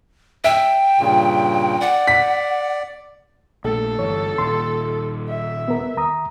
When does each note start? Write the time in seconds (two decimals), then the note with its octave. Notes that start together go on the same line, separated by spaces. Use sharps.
0.44 E5 G5
1.00 G2 A#2 C#3
1.81 D5 F#5
2.07 B6
3.64 A#1 A3 A4
3.99 G1 E3 C#5
4.38 D#1 C6
5.28 E5
5.68 B3 A#4
5.97 D#2 A#5 D#6